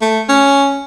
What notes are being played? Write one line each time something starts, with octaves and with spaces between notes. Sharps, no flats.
A3
C#4